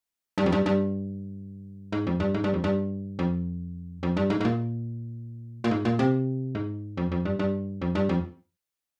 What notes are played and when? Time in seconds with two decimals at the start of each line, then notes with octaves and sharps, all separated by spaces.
0.38 G2
0.46 F2
0.52 G2
0.66 G2
1.92 G#2
2.07 F2
2.20 G2
2.34 G#2
2.44 G2
2.54 F2
2.64 G2
3.19 F2
4.03 F2
4.17 G2
4.30 G#2
4.41 G#2
4.45 A#2
5.64 A#2
5.71 G#2
5.85 A#2
5.99 C3
6.55 G#2
6.97 F2
7.12 F2
7.25 G2
7.39 G2
7.82 F2
7.95 G2
8.09 F2